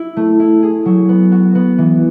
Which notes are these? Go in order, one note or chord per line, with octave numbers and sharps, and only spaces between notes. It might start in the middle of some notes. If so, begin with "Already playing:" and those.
Already playing: E4
A3
E4
G#4
F#3
B3
F#4
B3
E3